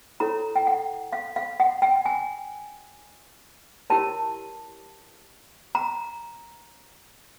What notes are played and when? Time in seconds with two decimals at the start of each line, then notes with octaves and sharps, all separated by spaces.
0.20 E4 A4 C#5 A#5
0.56 G5
0.67 F#5
1.13 F5
1.36 F5
1.60 F#5
1.82 G5
2.06 G#5
3.90 E4 G4 A#4 C#5 A5
5.75 A#5